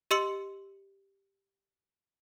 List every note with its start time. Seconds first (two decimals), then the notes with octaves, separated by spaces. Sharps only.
0.11 G4 D#5 C6 E6 C#7 F#7